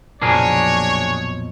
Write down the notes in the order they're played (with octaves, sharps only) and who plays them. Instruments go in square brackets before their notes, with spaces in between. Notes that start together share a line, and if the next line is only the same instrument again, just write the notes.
[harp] B1 F2 A#2 [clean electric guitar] D4 G#4 A#4 [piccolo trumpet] C#5